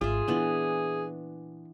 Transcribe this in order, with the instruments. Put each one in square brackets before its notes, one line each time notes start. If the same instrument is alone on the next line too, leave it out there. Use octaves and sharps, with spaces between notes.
[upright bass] G#1 [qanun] F4 E5 [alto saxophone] G#4
[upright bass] A#2 [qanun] E3 B3 D4